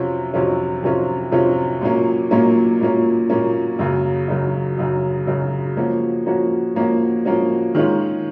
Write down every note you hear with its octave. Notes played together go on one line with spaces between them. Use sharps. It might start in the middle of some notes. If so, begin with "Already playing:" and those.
Already playing: F2 C3 F#3 C#4 F4
F2 C3 F#3 C#4 F4
F2 C3 F#3 C#4 F4
F2 C3 F#3 C#4 F4
A#2 F#3 A#3 C#4
A#2 F#3 A#3 C#4
A#2 F#3 A#3 C#4
A#2 F#3 A#3 C#4
F#2 C#3 F#3
F#2 C#3 F#3
F#2 C#3 F#3
F#2 C#3 F#3
F3 A#3 C#4 F#4
F3 A#3 C#4 F#4
F3 A#3 C#4 F#4
F3 A#3 C#4 F#4
D#3 G#3 C#4 F4